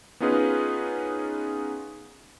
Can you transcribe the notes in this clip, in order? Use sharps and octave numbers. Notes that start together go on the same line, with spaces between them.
B3 C#4 D#4 F4 G#4 B4